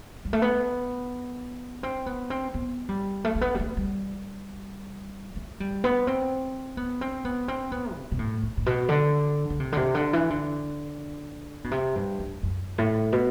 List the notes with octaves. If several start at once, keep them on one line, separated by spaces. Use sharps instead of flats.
G3
A3
B3
C4
B3
C4
B3
G3
A3
A3
B3
G3
A3
G3
A3
G3
B3
C4
B3
C4
B3
C4
B3
C3
B2
A2
A2
A2
B2
D3
D3
C3
D3
C3
D3
E3
D3
B2
C3
G2
F#2
F#2
A2
B2